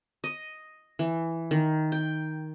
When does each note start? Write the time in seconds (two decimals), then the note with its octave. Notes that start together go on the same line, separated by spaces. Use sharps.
0.24 D#5
0.99 E3
1.51 D#3
1.92 G5